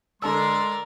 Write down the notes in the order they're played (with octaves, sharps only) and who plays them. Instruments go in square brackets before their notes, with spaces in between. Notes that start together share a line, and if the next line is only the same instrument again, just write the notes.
[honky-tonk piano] D3 A4 E6 [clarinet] G#3 [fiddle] A#4 D5 [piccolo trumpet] C6